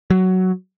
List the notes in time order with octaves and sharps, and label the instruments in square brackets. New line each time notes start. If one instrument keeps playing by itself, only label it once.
[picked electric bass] F#3